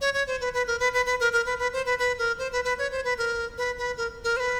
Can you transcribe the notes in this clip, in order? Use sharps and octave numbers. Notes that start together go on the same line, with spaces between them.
C#5
C#5
C5
B4
B4
A#4
B4
B4
B4
A#4
A#4
B4
B4
C5
B4
B4
A#4
C5
B4
B4
C#5
C5
B4
A#4
B4
B4
A#4
A#4
C5
B4